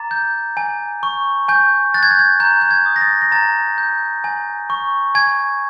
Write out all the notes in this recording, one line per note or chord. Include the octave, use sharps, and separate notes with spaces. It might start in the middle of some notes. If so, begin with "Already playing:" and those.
Already playing: A#5 D6 A6
G6
G#5
C#6
G#5 G6
F#6 A6
G#6
G6
G#6
A#5 G6
G6
G#6
D#6
A#6
A6
A#6
A#5 A6
G6
G#5
C#6
G#5 G#6